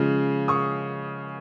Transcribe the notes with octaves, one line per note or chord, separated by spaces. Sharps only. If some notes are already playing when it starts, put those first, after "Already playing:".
Already playing: C#3 F3 G#3
C#6 D#6